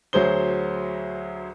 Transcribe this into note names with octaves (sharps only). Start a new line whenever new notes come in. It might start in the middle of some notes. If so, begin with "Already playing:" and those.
D2 F#3 G#4 C5 G7